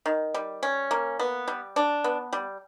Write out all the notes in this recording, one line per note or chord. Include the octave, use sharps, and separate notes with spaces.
D#3
G3
C#4
A#3
B3
G3
D4
B3
G3